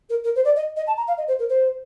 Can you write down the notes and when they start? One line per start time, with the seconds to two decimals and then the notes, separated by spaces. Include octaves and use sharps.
0.09 A#4
0.24 A#4
0.35 C5
0.44 D5
0.56 D#5
0.76 D#5
0.86 A5
0.97 A#5
1.07 F5
1.17 D#5
1.27 C5
1.39 A#4
1.49 C5